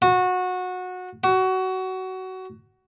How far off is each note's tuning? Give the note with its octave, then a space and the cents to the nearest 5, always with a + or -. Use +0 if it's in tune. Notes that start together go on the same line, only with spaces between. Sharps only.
F#4 -20
F#4 +20